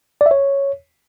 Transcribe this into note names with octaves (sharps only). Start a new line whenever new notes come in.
D5
E5
C#5